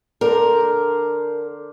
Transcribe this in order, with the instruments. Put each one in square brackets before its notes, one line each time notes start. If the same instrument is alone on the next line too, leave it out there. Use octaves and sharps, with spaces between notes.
[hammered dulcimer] D3 D4 C5 [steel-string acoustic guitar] A#4